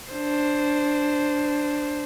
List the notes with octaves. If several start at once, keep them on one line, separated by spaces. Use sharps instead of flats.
D4 C5